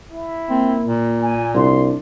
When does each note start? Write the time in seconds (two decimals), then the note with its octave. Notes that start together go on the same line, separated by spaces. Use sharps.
0.11 E4
0.50 A#3 C4
0.84 A#2
1.21 G#5
1.55 C2 D4 C6